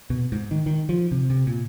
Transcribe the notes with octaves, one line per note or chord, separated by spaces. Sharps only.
B2
G#2
D#3
D#3
F3
C3
C3
A#2